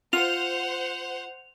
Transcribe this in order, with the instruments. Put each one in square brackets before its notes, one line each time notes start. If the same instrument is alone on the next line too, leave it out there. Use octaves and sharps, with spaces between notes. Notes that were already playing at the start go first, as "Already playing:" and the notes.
[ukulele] F4 [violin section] C5 F#5 [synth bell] F7